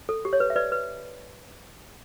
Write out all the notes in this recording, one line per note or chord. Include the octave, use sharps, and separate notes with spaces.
A4
G4
C#5
B4
E5
B4 D5
B4